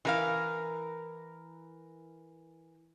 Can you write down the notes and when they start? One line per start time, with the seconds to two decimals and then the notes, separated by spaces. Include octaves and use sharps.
0.05 E3 A#4 F5